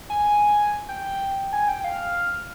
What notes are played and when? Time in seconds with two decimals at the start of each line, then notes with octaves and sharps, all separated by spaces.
0.10 G#5
0.25 G#5
0.89 G5
1.53 G#5
1.68 G5
1.84 F5